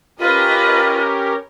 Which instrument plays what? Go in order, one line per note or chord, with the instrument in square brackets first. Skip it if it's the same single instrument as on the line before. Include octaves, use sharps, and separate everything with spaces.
[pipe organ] C#4 G4 A#4 [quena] F4 [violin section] B4 D#5